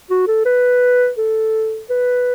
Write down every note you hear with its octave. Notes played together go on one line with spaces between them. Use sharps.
F#4
A4
B4
A4
B4